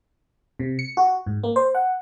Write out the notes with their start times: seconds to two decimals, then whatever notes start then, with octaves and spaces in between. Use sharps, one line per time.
0.59 C3
0.79 C#7
0.97 F#4
1.26 G#2
1.43 A#3
1.56 C5
1.75 F#5